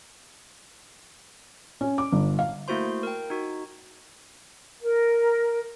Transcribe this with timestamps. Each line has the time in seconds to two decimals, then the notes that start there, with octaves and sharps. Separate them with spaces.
1.81 C#4
1.98 D6
2.12 G1
2.39 F5
2.68 A3 A#3 E4 F#4 C5 C6
3.03 A#4 G5
3.30 D#4 F#4
4.82 A#4